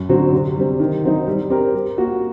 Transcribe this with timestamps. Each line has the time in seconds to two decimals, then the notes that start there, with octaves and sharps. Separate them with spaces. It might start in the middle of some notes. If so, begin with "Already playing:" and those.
Already playing: F#2
0.09 D3 F#3 C4 F#4
0.32 C3
0.56 G3 C4
0.80 D#3
1.04 F#3 C4 D#4
1.27 G3
1.50 C4 G4 A#4
1.73 G3
1.98 A#3 F#4